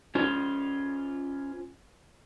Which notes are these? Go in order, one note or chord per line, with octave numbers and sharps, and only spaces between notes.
C#4 F4 C5